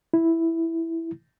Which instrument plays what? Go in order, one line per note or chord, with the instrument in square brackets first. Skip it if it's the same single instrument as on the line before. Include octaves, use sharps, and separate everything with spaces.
[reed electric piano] E4